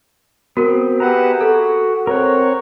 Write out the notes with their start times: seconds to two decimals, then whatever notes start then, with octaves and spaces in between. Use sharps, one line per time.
0.57 B3 C4 F#4 A#4
1.00 G4 G#4 B4 E5 F#5 A#5
1.41 F#4 A4
2.07 C4 A#4 B4 C#5 F#5